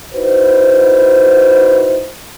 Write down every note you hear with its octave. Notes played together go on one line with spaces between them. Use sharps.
D#4 E4 F#4 B4 C5